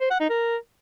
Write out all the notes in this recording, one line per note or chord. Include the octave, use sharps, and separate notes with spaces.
C5
F#5
D#4
A#4